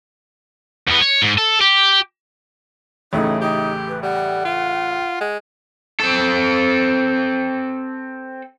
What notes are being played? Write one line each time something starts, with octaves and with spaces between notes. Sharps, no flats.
E2 B3
C#5
G#2
A4
G4
A1 A2 C#3 D#4
D#4 G4
B4
G3 F#5
F4
G#3
C4 A4